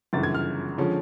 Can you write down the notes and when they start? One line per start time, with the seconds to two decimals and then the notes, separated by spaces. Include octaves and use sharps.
0.13 G1 F#2 C#3 E3 A6
0.23 G#6
0.35 F6
0.78 D3 F3 G#3 C#4